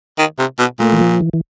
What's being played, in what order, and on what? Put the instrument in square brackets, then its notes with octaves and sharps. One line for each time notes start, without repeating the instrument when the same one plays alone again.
[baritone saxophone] D#3
C3
B2
[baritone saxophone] A#2 [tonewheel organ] A3
[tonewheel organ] E3
F3
E3
E3